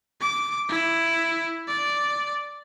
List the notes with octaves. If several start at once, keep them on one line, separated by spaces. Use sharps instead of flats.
D6
E4
D5